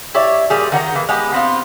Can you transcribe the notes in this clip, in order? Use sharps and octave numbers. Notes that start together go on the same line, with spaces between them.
E4 G4 C#5 D5
A#2 G3 G#4
D#3 F#5 G5 A#5
E3 A#3
G#3 B3 G4
B3 C4 F4